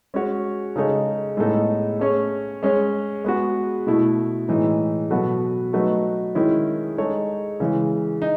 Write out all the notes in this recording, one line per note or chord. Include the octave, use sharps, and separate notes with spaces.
G#3 C#4 F#4 C#5
C#3 G#3 D#4 A4 C#5
A2 G#3 B3 D#4 A4
A3 C#4 G#4 C#5
G#3 C#4 G#4 C#5
G#3 B3 F#4
B2 A3 E4
A2 E3 G#3 D#4
B2 F#3 B3 F#4 A4
F#3 A3 D#4 F#4 B4
D#3 G#3 C#4 E4
G#3 D#4 A4 C#5
C#3 E3 G#3
D#4